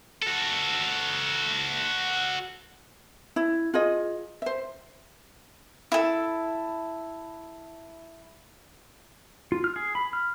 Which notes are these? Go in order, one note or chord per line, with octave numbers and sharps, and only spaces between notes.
F#4 A4
E4
F4 G#4 D#5
C5 E5
E4 A4
F4
F6
G#4
B5
F6